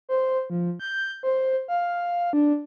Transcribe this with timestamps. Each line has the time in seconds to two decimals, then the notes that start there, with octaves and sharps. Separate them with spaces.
0.09 C5
0.50 F3
0.80 G6
1.23 C5
1.68 F5
2.33 D4